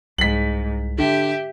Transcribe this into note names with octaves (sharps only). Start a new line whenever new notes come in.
C2 G#2 B6 F#7
D3 G4 E5